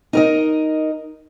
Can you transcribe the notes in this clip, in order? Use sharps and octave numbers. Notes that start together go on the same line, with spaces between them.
D#4 A#4 D#5